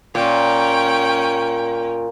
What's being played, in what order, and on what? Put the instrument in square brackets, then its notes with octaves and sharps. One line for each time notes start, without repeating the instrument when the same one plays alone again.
[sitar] A#2 [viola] C#4 G5